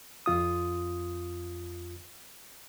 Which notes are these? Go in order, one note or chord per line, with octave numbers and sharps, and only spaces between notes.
F2 F4 D#6